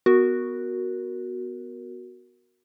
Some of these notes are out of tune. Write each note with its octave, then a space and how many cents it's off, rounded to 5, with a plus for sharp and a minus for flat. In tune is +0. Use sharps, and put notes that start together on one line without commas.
B3 +0 F#4 +0 A#4 +0